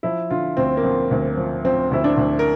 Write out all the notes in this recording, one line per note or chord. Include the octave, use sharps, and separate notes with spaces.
F3 E4
D3 F4
D2 C4
A#3
F3 C4
D2
F3
F3 C4
D2 E4
D4
D2
A#4